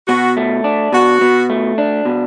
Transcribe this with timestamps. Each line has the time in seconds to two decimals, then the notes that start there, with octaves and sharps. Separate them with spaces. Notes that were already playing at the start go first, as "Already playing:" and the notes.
0.08 B2 F#4
0.37 A3
0.64 D4
0.93 B2 F#4
1.21 B2
1.50 A3
1.78 D4
2.05 B2